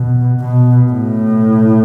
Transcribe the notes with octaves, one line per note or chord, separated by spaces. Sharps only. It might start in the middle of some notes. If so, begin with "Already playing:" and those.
Already playing: B2
B2
A2